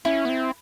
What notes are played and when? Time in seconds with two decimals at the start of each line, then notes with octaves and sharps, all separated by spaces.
0.05 C#4 E4
0.25 B3
0.29 C4